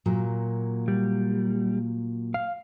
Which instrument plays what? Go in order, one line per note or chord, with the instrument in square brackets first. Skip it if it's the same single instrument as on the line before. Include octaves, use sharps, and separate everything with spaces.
[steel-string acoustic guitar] A#2 F#3 A#3
[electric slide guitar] G3
F5